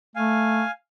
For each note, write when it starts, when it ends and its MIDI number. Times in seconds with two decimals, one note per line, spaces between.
0.16 0.63 57
0.16 0.71 77
0.16 0.71 80